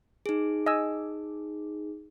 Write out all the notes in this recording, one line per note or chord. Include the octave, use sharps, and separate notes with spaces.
D#4 G#4
D#5 G#5 E6